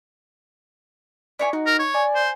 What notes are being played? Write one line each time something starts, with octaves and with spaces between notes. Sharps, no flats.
E4 C#5 D5 G#5
D#4 F#4
A#4
C#5
D5 G#5
C5